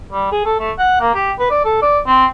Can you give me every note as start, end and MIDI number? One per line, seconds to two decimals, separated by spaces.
0.12 0.27 55
0.32 0.41 68
0.45 0.55 69
0.60 0.71 57
0.79 1.01 78
1.01 1.10 58
1.15 1.32 67
1.39 1.47 71
1.50 1.65 74
1.65 1.81 69
1.82 1.99 74
2.07 2.25 60